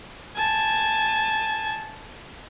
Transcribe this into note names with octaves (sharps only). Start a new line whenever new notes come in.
G#5 A5